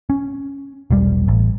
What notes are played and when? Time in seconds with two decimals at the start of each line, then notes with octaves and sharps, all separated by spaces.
0.10 C#4
0.91 E1 B1 G3
1.28 A1